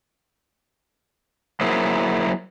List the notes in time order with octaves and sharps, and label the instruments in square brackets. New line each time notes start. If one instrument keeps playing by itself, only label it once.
[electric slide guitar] F#3 A#3 E4 G#4 C5